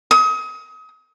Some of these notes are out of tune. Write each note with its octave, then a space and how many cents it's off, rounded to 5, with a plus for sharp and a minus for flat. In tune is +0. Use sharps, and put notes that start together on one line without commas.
D#6 +35